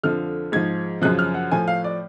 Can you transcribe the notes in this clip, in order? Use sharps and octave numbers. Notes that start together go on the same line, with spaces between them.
F2 D3 F3 F6
G#2 F3 G#6
F#2 C#3 F3 F#6
F6
F#5
A2 F3 G#5
F5
D5